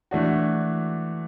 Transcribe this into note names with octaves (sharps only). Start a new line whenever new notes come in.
E3 A3 D4 F#4